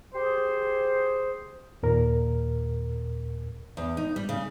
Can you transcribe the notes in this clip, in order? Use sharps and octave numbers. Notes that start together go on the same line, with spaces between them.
G4 G#4 C5
D#2 A#2 A#4
E2
D#4
G3
C#3